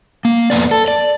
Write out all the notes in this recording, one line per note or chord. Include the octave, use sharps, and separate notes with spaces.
A#3
F2 A#3 B3 D5
A4
D5